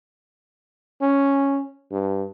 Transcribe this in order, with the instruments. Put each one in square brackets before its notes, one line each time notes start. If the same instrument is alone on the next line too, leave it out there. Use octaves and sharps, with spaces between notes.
[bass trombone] C#4
G2